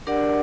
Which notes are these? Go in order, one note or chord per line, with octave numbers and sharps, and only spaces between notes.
D4 G4 A#4 D5 F#5